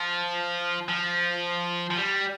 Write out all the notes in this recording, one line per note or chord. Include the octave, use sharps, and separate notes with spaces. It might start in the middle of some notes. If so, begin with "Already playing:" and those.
Already playing: F3
F3
F3
G3